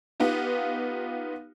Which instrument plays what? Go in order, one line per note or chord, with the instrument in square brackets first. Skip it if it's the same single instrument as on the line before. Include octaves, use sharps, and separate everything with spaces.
[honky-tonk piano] B3 D#4 F4 G4